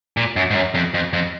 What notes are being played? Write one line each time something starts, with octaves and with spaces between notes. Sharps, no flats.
A#2
F#2
G#2
F#2
F2
F2
F2